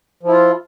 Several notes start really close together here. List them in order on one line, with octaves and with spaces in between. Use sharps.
F3 E4 F4